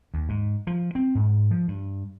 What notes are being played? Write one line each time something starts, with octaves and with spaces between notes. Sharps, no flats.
D#2
G#2
F3
C4
G#2
F3
G2